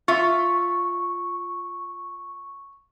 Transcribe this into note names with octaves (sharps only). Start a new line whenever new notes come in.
F4 E5 C#6